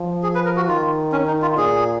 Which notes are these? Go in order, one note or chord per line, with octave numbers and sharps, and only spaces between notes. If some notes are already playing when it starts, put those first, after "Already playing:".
Already playing: F3
G#4
B4
A#4
F#4
D#3 F4
C#4
D#4
F4
A#2 G#4